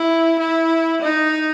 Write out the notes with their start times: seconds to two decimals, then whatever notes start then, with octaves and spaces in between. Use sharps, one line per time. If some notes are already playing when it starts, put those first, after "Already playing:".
Already playing: E4
0.39 E4
1.02 D#4